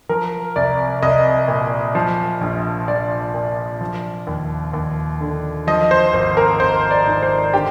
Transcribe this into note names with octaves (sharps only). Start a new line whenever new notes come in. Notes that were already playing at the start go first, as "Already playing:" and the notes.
F3 A#4
C2 D5
C2 D#5
A#2
F3
A#1
A#1 D5
A#2
F3
D#2
D#2
D3
F3 D#5
C5
G#1 C5
A#4
G#1 C5
D5
G#2
C5
D3 G4